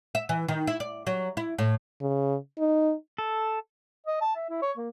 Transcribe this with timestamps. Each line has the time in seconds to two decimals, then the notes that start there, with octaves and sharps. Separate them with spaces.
0.15 E5
0.29 E3
0.48 D#3
0.67 E4
0.80 D5
1.07 F#3
1.37 E4
1.59 A2
2.01 C#3
2.59 D#4
3.18 A4
4.07 D#5
4.21 A5
4.35 E5
4.50 E4
4.62 C#5
4.78 A#3